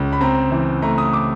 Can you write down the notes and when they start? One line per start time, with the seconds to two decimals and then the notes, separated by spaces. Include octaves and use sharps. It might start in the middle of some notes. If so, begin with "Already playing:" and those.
Already playing: C#2
0.13 B5
0.21 C4 A#5
0.52 E3
0.82 A3 A#5
0.98 D#6
1.13 D6